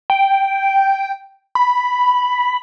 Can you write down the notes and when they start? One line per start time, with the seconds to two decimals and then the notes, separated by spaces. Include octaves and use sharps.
0.10 G5
1.55 B5